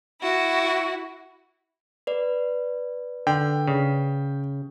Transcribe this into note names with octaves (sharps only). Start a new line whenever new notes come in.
E4 F#4
B4 D5
D3 G5
C#3